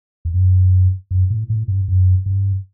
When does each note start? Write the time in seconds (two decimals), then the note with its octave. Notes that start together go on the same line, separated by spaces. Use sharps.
0.25 E2
0.34 F#2
1.11 F#2
1.30 A2
1.50 A2
1.68 G2
1.88 F#2
2.26 G2